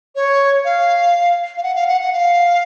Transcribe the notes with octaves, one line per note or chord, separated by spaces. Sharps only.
C#5
F5
F5
F#5
F5
F#5
F#5
F5